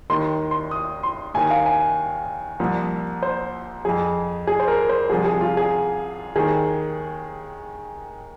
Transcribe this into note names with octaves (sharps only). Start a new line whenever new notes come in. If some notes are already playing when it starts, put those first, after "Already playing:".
D#2 D#3 C6
C6
D#6
C6
D#2 D#3 G#5
F5
G#5
C2 A#2 F3
C5
F2 F3 G#4
G#4
C5
A#4
C5
C2 C3 F3 G#4
G#4
F4
G#4
D#2 D#3 G#4